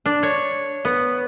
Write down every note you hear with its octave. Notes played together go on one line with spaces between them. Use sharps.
D4
C#5
B3